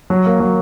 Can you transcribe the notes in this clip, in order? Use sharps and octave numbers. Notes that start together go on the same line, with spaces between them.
F#3
A#3
F#3